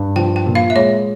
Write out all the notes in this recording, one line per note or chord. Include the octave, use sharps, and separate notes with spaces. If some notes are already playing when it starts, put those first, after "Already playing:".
Already playing: G2
F3 G5
G5
A#2
F5
E5
G#3 C#5